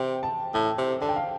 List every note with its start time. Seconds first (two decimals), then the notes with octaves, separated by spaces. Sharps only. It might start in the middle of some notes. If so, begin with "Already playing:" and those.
Already playing: C3 G5
0.23 A5
0.54 A2 A5
0.78 C3
1.01 D3 A5
1.09 G5
1.16 F5